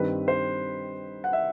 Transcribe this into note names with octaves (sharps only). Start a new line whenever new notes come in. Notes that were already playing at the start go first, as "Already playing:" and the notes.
Already playing: G2 D#3 G3 C4 B4
C5
F#5
E5